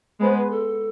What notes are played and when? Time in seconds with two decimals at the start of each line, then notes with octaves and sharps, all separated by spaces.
0.20 G#3 B3 C5
0.36 B4
0.50 A4